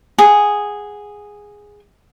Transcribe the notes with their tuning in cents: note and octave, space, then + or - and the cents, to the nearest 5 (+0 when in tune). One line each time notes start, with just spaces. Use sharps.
G#4 -5 F#5 +0